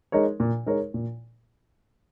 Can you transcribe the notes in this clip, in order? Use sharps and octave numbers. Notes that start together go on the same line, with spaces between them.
G#3 D#4 A#4 C#5
A#2
G#3 D#4 A#4 C#5
A#2